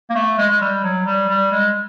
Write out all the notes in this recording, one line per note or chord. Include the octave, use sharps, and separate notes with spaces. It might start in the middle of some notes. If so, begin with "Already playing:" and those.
A#3
A3
G#3
G#3
G3
F#3
G3
G3
G#3